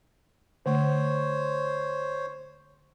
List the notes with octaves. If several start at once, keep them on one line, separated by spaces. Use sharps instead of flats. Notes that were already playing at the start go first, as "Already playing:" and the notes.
D3 A3 C5 C#5